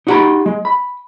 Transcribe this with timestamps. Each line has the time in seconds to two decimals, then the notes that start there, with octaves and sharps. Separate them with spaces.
0.07 D#4 E4 F#4 G4 A#5 B5
0.46 G#3
0.65 B5